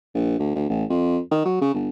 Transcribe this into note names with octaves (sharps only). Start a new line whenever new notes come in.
A#1
D2
D2
A1
F2
D#3
F#3
C#3
G1